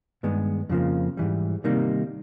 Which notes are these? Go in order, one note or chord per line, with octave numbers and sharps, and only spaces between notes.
G2 D#3 G#3 B3
F2 C#3 F3 A#3
G#2 E3 G3
C3 D#3 G3 A#3 D#4